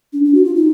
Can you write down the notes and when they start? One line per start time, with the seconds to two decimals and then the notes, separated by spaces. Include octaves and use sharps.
0.13 D4
0.24 D4
0.34 F#4
0.44 F4
0.55 D#4